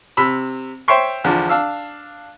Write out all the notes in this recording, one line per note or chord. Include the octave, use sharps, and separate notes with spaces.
C3 B5 E6
C5 C#5 E5 G5 C6 C#6
E2 D3 F3
D4 F5 E6